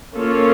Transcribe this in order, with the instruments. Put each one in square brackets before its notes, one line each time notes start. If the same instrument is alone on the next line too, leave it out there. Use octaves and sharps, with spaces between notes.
[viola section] A#3 C#4 F4 A4 C#5